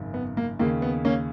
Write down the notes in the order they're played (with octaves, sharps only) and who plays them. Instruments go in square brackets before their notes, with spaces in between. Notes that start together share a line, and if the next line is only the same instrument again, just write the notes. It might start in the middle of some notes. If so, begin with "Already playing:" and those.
Already playing: [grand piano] G#1 F#2 C#3
B3
A#3
D#2 C#3 A#3
B3
A#3 C#4